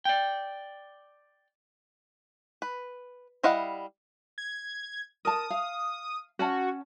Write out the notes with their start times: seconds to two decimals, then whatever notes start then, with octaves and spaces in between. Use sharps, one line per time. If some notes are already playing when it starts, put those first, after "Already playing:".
0.05 D5 G5
2.62 B4
3.43 G3 E4 D#5 F5 F#5
4.38 G#6
5.25 A#4 A5 D#6
5.50 F5
6.39 C#4 F#4 F#5 A5